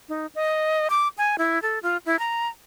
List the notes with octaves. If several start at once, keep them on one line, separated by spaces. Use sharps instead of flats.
D#4
D#5
D6
G#5
E4
A4
F4
E4
A#5